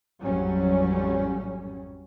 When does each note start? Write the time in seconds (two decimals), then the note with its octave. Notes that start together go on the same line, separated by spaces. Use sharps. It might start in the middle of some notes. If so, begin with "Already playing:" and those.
0.22 A1 F2 F#3 G3 C#4